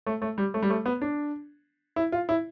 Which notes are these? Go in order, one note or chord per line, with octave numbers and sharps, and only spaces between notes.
A3
A3
G3
A3
G3
A3
B3
D4
E4
F4
E4